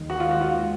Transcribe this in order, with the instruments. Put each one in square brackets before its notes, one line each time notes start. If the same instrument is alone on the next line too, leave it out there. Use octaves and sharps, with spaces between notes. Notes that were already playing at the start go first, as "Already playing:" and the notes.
Already playing: [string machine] D#2 D#3 G#3
[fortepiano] F#4
F4
F#4
F4